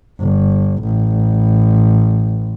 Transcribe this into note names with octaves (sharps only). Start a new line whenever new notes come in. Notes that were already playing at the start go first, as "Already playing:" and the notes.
G1
A1